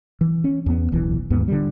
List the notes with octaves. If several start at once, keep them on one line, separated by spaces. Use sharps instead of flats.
E3
C#4
E2 B3
D1 B1 E3
D#2 G#2 B3
D3 G3